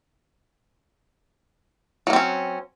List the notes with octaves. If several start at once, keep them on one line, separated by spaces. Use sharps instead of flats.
F#3 A#3 C4 C#4